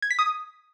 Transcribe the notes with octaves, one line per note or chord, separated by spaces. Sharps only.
G#6
B6
D#6